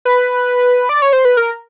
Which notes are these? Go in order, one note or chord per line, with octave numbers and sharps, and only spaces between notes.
B4
D5
C#5
C5
B4
A#4